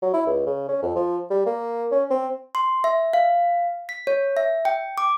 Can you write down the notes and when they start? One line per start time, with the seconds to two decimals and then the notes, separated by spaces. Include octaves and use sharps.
0.02 F#3
0.14 E4
0.26 C#2
0.46 C#3
0.68 C#4
0.82 F2
0.96 F3
1.30 G3
1.46 A#3
1.92 C#4
2.10 C4
2.55 C6
2.84 E5
3.13 F5
3.89 B6
4.07 C#5
4.37 E5
4.65 G5
4.98 D6